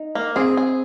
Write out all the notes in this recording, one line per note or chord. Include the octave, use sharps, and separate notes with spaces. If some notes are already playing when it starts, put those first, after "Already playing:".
Already playing: D#4
A#3
C4 G#4
G#4